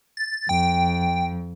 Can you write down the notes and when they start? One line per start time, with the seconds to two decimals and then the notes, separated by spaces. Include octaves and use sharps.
0.17 A6
0.49 F2 G5